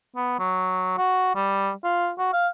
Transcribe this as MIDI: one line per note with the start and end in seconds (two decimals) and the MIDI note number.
0.16 0.39 59
0.39 0.95 54
0.98 1.34 66
1.36 1.71 55
1.84 2.11 65
2.19 2.30 66
2.33 2.48 77